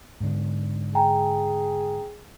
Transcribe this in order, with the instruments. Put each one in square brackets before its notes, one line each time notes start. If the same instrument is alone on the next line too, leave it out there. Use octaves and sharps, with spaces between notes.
[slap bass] G#2 D3
[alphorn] G#4 [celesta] G5 G#5 A#5